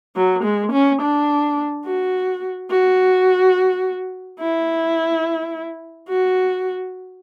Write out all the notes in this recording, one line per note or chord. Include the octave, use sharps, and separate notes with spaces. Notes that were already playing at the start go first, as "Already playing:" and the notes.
F#3
G#3
C#4
D4
F#4
F#4
E4
F#4